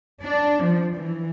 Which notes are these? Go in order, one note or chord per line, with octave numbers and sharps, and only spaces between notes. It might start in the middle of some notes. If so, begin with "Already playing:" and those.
D4
F3
E3